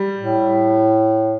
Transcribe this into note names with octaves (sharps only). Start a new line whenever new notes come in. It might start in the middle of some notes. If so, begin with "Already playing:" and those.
Already playing: G3
A2